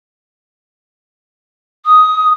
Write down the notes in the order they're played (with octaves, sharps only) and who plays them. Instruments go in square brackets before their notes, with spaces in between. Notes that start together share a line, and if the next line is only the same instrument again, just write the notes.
[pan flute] D#6